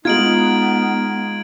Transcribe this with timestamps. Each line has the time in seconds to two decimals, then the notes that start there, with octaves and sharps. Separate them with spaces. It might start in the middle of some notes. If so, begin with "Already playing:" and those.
0.05 G#3 B3 D#4 F4 G#6 D7 F#7